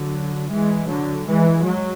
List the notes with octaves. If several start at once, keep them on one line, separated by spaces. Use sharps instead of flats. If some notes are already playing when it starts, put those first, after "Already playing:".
Already playing: D3 F#3
E3 G#3
D3 F#3
E3 G#3
F#3